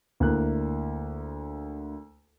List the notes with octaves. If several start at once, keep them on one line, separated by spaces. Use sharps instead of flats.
D2 A#3 E4 F#6